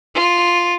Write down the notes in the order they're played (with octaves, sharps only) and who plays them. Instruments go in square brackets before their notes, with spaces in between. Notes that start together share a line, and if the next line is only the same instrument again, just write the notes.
[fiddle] F4